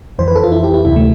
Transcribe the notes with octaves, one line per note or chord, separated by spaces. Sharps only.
F2 E3 C5
B4
A4
F4
E4
G4
E4
D2 C3 E3 E4
A3